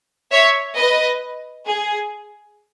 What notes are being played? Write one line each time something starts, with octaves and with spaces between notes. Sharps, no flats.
C#5 E5
B4 D#5
G#4